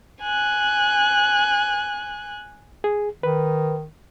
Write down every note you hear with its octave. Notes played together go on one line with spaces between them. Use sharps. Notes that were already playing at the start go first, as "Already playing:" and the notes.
G#5 F#6
G#4
D#3 B4